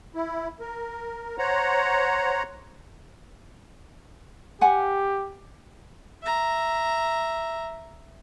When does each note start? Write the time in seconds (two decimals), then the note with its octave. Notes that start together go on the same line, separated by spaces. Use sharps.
0.15 E4
0.60 A#4
1.38 C5 C#5 F#5 A#5
4.61 G4 F#5 G#5
6.22 E5 A#5